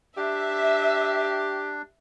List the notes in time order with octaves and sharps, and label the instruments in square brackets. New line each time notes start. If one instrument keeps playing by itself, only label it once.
[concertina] D4 [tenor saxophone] G4 [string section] E5